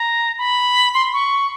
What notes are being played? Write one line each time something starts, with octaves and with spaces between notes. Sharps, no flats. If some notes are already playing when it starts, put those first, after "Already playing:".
Already playing: A#5
B5
C6
C#6